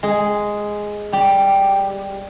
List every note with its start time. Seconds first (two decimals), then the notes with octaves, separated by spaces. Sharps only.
0.03 G#3 G#4
1.12 G3 G4